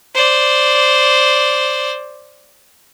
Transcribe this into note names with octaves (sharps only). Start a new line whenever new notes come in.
C5 D5